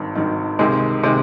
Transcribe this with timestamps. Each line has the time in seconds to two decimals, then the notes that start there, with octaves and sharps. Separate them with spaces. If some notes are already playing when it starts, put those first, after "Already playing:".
Already playing: G#1 G2 D#3
0.15 G#1 G2 D#3
0.59 C#2 C3 D#3 G#3
1.04 C3 D#3 G#3